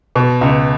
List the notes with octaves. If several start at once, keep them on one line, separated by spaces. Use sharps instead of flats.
B2
C#2